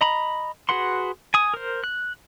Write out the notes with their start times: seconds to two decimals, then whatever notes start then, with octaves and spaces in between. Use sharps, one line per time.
0.01 D#5 A#5 B5
0.69 F#4 G#4 B4 F#5 C6
1.34 G#5 D#6
1.54 A#4 C5
1.84 F#6